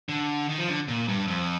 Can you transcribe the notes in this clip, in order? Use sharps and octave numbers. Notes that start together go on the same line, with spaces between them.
D3
D#3
F3
D3
A#2
G2
F2